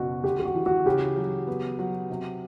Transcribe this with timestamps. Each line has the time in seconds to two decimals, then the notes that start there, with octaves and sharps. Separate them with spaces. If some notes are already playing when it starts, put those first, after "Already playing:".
Already playing: F#1 B2 F#4
0.24 D2 G4
0.39 G4
0.45 F#4
0.55 E3
0.66 F#4
0.86 C#3 G4
1.16 F#3
1.47 B3
1.79 F#3
2.10 C3